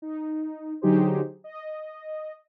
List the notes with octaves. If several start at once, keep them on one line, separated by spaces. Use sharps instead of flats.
D#4
D3 F#3 D#4 G4 G#4 C5
D#5